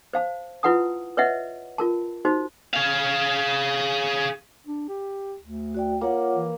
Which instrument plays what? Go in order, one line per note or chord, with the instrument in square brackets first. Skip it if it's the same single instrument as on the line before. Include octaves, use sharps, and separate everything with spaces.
[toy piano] C5 F5 A5
E4 F4 B4 F#5 A5 D#6
B4 C#5 D#5 E5 F#5
F4 A#4 A5
D#4 F#4 C5
[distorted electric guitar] G#4 F5
[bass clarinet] D4
G4
D2
[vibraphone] F#4 D5 G5
[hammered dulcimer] A#3 [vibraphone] F4 C#5 F#5
[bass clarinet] E3